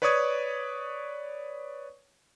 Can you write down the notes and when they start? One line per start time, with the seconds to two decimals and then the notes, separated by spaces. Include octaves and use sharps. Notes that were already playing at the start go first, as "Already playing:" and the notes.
0.02 B4 C#5 D5 C#6 D#6 G#6